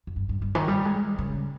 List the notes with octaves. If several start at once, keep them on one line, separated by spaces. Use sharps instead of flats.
F2
G2
G2
G2
D#3
G3
G#3
C#3